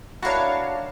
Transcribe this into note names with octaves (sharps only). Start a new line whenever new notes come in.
D4 E4 F#4 A#4 C#5 F5 A5